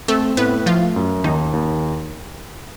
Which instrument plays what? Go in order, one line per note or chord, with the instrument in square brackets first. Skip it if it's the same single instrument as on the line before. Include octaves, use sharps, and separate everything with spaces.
[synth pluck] A3 A4 [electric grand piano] C4
[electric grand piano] A2 [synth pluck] B3 B4
[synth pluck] F3 F4 [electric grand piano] A3
[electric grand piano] F#2
[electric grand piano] D#2 [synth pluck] D#3 D#4
[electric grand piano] D#2